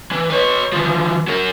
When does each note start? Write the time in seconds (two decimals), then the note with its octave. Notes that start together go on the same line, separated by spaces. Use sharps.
0.12 E3
0.30 B4 C#5
0.73 E3 F3
1.28 F#3 A#4